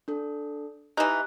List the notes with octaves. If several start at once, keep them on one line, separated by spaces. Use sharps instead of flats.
D4 A4
E3 D#4 G4 F#6